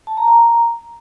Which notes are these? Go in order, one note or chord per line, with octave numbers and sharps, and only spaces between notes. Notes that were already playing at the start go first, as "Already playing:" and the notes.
A5
A#5
A#5